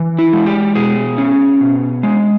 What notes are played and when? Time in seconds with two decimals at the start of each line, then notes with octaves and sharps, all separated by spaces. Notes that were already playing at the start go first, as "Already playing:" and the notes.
Already playing: E3
0.18 E4
0.33 G#3
0.46 G4
0.75 B2 G#4
1.18 C#4
1.61 B2
2.03 G#3